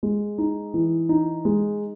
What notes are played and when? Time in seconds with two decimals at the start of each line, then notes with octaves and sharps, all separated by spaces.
0.03 G#3
0.38 D#4
0.74 E3
1.09 D#4
1.45 G#3